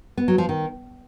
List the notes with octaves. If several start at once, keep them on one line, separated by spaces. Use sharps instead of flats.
B3
F#3
F3
D#3